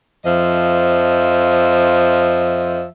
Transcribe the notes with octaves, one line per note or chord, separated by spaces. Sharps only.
F2 F3 D#5 E5